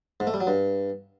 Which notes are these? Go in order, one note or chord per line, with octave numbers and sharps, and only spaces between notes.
G#2
A3
G3
F#3
G2